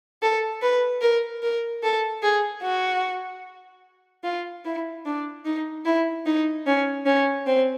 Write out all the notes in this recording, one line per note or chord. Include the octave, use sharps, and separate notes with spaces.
A4
B4
A#4
A#4
A4
G#4
F#4
F4
E4
D4
D#4
E4
D#4
C#4
C#4
C4